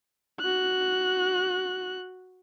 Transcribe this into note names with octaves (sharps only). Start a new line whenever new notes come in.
F#4 F#6